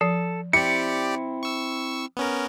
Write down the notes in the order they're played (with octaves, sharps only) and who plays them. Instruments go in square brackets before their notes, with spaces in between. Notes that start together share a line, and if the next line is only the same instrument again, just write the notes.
[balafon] F3 [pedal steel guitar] A4
[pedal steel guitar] C4 E4 [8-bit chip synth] G4 D5 [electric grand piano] C#7
[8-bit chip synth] C#6 E6
B3 C#4 A#4